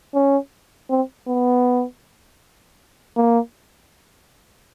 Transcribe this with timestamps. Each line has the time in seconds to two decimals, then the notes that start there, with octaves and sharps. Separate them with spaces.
0.14 C#4
0.90 C4
1.27 B3
3.16 A#3